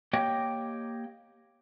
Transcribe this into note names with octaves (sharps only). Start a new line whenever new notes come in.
A#3 G4 C#5 D#5 G5